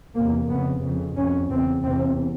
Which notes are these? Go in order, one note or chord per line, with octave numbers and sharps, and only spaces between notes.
E2 C3 A#3
F2 C#3 B3
F2 C#3
F2 C3 C#4
E2 C#3 C4
E2 C3 C4